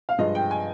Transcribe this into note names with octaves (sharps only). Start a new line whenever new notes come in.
F5
G2 F3 G#3 D#5
G5
G#5